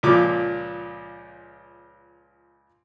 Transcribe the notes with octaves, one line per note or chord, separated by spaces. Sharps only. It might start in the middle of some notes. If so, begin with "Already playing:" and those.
C#2 A#2 F3 D6 D#6